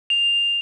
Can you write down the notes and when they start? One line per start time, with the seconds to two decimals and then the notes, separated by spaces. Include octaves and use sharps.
0.10 F7